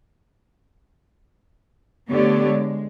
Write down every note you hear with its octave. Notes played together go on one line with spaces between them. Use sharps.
D3 A3 B3 G4 C#5 D5
G#3